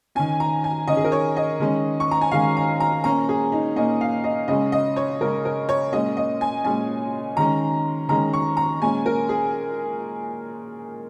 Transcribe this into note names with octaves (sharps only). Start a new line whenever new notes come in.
D#3 C#4 G#5
A#5
G#5
D#3 C#4 D#5
G#4
A#4
C#5
D#5
D#3 G#3 C#4
C#6
A#5
G#5
D#3 G#3 C#4 F5
A#5
A#5
A#2 A#3 C#4 A#5
G#4
D#4
A#2 A#3 C#4 D#5
F5
D#5
C#3 G#3 C#4 D#5
D#5
C#5
C#3 G#3 C#4 A#4
A#4
C#5
A#2 G#3 C#4 D#5
D#5
G#5
A#2 G#3 C#4 G#5
D#3 G#3 C#4 A#5
D#3 G#3 C#4 A#5
C#6
A#5
A#2 G#3 C#4 G#5
A#4
G#4